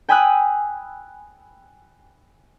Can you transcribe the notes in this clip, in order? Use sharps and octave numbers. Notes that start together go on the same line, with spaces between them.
G5 G#5 B5 D#6 E6 F#6